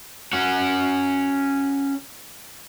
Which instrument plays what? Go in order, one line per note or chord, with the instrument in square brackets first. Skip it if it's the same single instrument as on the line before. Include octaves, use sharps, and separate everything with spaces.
[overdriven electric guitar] C#4 F#4